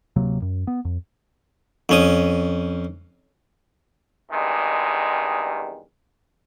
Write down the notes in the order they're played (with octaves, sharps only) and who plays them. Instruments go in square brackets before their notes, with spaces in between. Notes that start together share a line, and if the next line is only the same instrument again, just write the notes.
[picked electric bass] D1 C3 F#3 A#3
F#2
B3
F2
[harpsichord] F2 C#4 D#6
[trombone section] E2 G2 C3 D#3 G#3